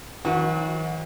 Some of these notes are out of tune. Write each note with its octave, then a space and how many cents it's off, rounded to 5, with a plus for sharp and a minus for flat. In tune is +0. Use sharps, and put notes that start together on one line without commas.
D#3 +45 F#3 -40 F#4 -25